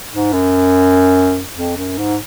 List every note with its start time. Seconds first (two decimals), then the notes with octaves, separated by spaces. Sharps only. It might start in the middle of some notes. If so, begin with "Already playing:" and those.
0.12 G#2
0.33 F#2
1.57 F2
1.77 F#2
1.98 G#2